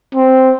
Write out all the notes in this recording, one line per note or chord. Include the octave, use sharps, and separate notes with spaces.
C4